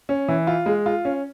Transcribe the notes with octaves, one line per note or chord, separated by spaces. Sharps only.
C#4
E3
F4
G#3
F4
C#4